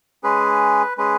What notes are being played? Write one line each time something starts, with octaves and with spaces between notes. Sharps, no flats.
G#3 C#4 G#4 B4
G#3 C#4 G#4 B4